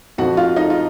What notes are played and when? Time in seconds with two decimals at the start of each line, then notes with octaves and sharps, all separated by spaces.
0.18 F2 F3 F#4 F#5
0.37 F4 F5
0.56 D#4 D#5
0.70 F4